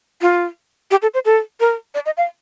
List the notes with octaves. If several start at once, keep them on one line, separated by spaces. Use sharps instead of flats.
F4
G4
A4
C5
A4
A#4
D5
D#5
F5